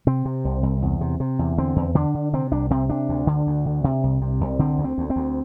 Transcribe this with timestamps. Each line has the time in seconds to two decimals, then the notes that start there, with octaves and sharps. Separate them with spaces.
0.07 C3 C4
0.25 C3
0.45 C2
0.63 C2
0.82 E2
1.01 C3
1.20 C3
1.39 E2
1.58 D3 C4
1.76 E2
1.95 D3 D4
2.14 D3
2.33 C3 C4
2.52 C2 D4
2.70 C3 C4
2.89 C3 D4
3.09 D2
3.27 D3
3.47 D2
3.65 D3
3.84 C3
4.03 C2
4.22 C3
4.41 C2
4.59 D3 C4
4.78 D2
4.84 C4
4.98 D2
5.10 C4
5.16 D2